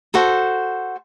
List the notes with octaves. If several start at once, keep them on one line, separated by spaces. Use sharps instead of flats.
F#4 A4 C5